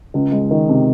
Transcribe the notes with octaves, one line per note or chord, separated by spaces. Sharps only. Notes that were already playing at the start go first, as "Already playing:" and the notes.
C#2
G#3
D#3
C3